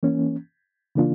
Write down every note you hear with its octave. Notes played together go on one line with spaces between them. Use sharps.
E3 A#3 C#4
C#3 E3 A#3 D4 F4